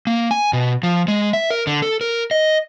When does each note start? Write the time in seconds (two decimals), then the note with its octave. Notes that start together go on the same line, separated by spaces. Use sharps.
0.07 A#3
0.31 G#5
0.53 B2
0.83 F3
1.08 G#3
1.33 E5
1.50 A#4
1.67 D3
1.82 A4
2.01 A#4
2.31 D#5